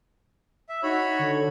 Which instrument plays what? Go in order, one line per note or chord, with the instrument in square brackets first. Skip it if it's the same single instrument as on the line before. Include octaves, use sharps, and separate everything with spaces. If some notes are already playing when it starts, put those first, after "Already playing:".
[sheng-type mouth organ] E5
[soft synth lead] D#4 [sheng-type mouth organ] F#4 C#5 B5
[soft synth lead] D3